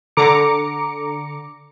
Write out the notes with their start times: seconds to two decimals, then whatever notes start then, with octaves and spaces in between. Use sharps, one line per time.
0.17 D3 A#5 D6 C#7